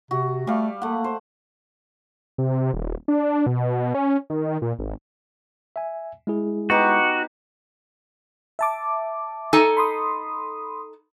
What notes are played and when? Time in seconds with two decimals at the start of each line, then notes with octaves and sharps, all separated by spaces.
0.11 C3 F#4
0.47 G3 A3 F5
0.82 A3 A#3 F#5
1.04 C5
2.38 C3
2.74 D#1
3.08 D4
3.46 B2
3.94 C#4
4.30 D#3
4.62 A#2
4.79 G#1
5.76 E5 G#5
6.27 G#3 E4 G#4
6.70 B3 D#4 F#4 G4
8.59 E5 A5 D6
9.53 D#4 A4 G#5
9.77 B5 C6 D#6